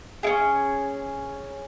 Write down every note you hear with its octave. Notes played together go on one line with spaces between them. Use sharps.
C#4 E4 G#4